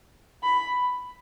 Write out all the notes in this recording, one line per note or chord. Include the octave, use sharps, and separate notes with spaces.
B5